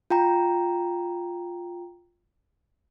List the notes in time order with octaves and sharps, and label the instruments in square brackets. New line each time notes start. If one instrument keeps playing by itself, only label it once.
[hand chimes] F4 G5 A#5